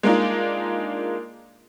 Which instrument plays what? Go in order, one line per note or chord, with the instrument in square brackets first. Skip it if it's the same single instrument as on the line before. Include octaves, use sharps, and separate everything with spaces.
[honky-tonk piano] G#3 A#3 D4 D#4 F4